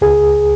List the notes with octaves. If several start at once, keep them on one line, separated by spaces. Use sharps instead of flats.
C#2 G#4